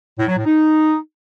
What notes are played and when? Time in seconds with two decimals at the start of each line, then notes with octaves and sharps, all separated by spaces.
0.18 A2
0.27 F#3
0.36 A2
0.45 D#4